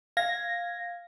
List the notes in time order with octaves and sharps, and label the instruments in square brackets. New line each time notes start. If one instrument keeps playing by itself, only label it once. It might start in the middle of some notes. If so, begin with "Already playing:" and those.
[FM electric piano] F5 G#6 A#6